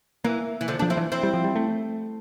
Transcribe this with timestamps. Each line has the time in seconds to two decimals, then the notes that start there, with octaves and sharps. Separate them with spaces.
0.24 E3 A#3
0.61 E3
0.68 D3 F3
0.79 F3 D4
0.90 C4 E4
0.97 E3
1.12 C4 E4
1.23 G3
1.34 F3
1.44 G3
1.55 A3